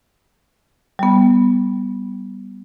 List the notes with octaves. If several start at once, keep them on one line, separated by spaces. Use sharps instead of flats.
G3 B3